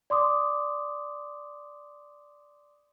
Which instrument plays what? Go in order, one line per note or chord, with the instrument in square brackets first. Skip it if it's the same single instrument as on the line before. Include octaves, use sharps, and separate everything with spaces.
[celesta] D5 C6 D6 D#6